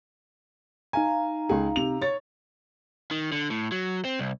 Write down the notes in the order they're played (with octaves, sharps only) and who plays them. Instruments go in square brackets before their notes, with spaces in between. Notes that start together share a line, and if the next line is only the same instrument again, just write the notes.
[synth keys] D#4 F5 A#5 [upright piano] G#5
[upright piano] C#2 G#4
C3 F7
C#5 A6
[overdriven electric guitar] D#3
D3
A2
F#3
C4
C2